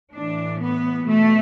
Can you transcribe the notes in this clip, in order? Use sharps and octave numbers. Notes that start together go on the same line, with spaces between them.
A2 E3 D4
B3
B2 A3